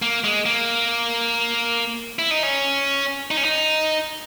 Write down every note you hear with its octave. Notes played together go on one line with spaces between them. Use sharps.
A#3
G#3
A#3
E4
D#4
C#4
D#4
C#4
D#4